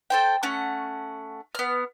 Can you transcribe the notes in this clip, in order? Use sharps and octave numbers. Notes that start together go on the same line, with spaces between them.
A4 C5 G5
A3 C#4 F#5
B3 F6